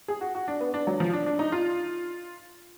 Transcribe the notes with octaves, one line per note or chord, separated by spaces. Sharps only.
G#4
F#4
F#4
D4
B3
D4
F#3
F3
D4
D4
D#4
F4